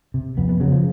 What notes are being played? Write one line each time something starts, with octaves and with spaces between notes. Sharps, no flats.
C3
F2 B3
B3
C#3 F#3
F3